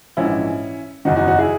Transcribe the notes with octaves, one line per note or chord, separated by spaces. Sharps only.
A#1 G#2 E3 C#4 E4
F#1 E2 D#3 D#4 F#4
D#4 F#4
D#4 F#4
E4 G#4